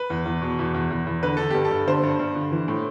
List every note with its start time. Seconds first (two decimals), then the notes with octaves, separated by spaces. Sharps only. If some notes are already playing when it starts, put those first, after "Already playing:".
Already playing: B4
0.10 E2
0.26 E2
0.42 B2
0.59 E2
0.74 E2
0.90 E2
1.07 E2
1.23 D3 B4
1.37 D3 A4
1.50 G2 G4
1.65 A4
1.71 G2
1.87 D3 C5
2.03 G2
2.19 G2
2.36 D3
2.52 E3
2.68 A2